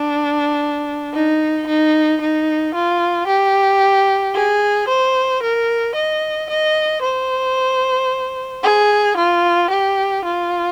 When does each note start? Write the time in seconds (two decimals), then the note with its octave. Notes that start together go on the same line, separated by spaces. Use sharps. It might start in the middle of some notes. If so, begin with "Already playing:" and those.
Already playing: D4
1.14 D#4
1.67 D#4
2.21 D#4
2.75 F4
3.28 G4
4.35 G#4
4.88 C5
5.43 A#4
5.95 D#5
6.50 D#5
7.02 C5
8.63 G#4
9.17 F4
9.71 G4
10.25 F4